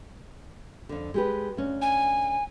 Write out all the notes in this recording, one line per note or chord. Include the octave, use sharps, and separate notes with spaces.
F2 D3
G#3 G4 B4
D2 C#4
G#5